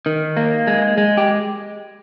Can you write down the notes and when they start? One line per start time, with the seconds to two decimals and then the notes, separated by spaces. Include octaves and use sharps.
0.06 D#3
0.37 A#3
0.67 G#3
0.98 G#3
1.17 G4